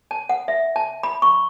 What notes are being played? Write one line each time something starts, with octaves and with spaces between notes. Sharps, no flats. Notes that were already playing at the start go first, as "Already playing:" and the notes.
A5
F#5
E5
A5
B5
C#6